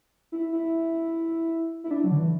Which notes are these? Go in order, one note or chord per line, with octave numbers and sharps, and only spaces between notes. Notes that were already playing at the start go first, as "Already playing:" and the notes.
E4
E4
E4
D4
F#3
D3
E3